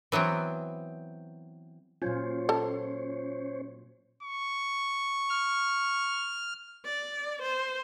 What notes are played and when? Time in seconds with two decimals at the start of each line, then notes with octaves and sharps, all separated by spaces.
0.12 E3 F#3 B3 C4
2.02 A#2 F#3 C#4 F4 C5 C#5
2.49 A4 A5
4.23 C#6
5.30 F6
6.85 D5
7.42 C5